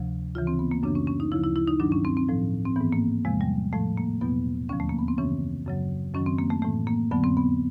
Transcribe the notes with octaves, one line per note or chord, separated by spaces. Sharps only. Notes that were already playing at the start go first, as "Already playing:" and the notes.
Already playing: D2 C3 F3
D2 C#3 E3 F4
C4
B3
A#3
F#2 C#3 E3 D4
C#4
C#4
D#4
D2 C#3 F3 E4
E4
E4
D#4
G2 D#3 F#3 D4
C#4
C4
C4
A2 F3
C4
G#2 E3 B3
A#3
E2 C3 F3 G#3
G3
A2 F3 A3
A#3
E2 B2 F#3 B3
D#2 D3 F3 C#4
A3
A#3
B3
C4
F#2 C#3 E3 C#4
F#2 C#3 F#3
F#2 D#3 F#3 C#4
C4
A#3
A3
A2 E3 A3
A#3
F2 D3 F#3 B3
C4
B3